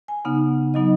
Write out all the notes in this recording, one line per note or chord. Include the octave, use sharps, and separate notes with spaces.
G#5
C#3 B3 D#4 F#5
F#3 B3 D#4 D#5